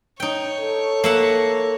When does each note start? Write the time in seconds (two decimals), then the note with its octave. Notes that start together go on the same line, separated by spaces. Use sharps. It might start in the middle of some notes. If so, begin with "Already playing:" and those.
0.20 D#4 C#5 G5
0.60 A4
1.04 A#3 E5 F#5